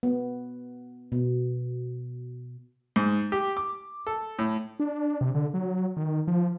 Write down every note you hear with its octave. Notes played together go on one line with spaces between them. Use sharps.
B3
B2
G#2
G4
D6
A4
A2
D4
C3
D3
F#3
D#3
F3